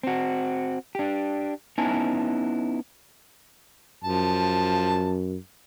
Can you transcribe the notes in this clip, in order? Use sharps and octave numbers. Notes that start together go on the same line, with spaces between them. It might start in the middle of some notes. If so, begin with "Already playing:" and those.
C4 F#4
D4 G4
B3 C#4 D#4 E4 G#5 A5
F#2 F3 A5